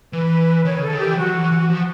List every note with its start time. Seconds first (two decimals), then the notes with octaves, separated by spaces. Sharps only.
0.13 E3 B4
0.64 D#3 C#5
0.78 C#3 A4
0.91 D#3
0.99 E3 G4
1.17 F#3 F#4
1.34 E3
1.52 E3
1.69 F3 F#4